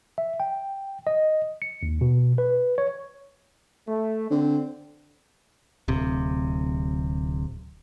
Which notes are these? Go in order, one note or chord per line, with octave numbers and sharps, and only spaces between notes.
E5
G5
D#5
C#7
D#2
B2
B4
C#5
A3
D3 C4
D1 C3